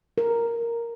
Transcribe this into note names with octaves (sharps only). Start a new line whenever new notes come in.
A#4